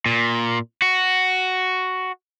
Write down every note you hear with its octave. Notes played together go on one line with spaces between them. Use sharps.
A#2
F#4